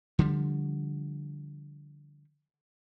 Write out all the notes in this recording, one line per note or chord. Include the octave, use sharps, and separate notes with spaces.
D3 F3 G3